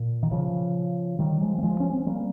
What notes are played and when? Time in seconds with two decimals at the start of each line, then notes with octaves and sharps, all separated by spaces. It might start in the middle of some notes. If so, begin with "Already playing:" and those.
Already playing: A#2
0.23 D#3
0.31 C#3 F3
1.19 D#3 G3
1.41 F3 G#3
1.58 A#3
1.63 F3 G#3
1.80 C#4
1.93 C4
2.06 G3 A#3